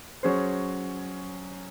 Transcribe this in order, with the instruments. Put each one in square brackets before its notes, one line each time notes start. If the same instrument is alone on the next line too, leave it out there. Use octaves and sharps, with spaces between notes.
[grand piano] F#3 C#4 G#4 C5